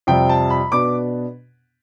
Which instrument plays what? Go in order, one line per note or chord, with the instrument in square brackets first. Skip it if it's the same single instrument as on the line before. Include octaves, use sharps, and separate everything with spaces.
[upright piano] F2 C3 G3 G5
A5
B5
B2 B3 D4 D6